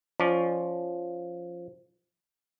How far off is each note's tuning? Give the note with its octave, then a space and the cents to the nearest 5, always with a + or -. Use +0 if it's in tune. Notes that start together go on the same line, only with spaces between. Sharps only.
F3 +0 C#4 +10 D5 +25